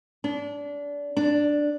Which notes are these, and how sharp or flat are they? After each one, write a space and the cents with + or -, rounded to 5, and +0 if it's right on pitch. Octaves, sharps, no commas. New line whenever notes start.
D4 -25
D4 +5